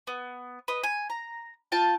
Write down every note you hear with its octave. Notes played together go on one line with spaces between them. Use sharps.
B3
B4 D#5
G#5
A#5
F4 G5 A5